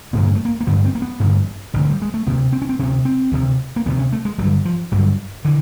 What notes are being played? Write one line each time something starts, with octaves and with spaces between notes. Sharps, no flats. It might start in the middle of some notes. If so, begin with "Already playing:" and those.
A1 G2 D3 B3
A#3
A3
A#3
A#3
A1 G2 D3 B3
C4
A#3
B3
A1 G2 D3
A1 G2 D3
G3
G#3
A3
D2 C3 A#3
C4
C#4
C4
D2 C3 C#4
C4
D2 C3
A#3
D2 C3 B3
C#4
A3
G#3
G1 G2 D3 F#3
F3
G1 G2 D3 F#3
D3 E3